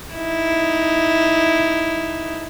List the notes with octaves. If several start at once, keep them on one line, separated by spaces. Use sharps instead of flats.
D#4 E4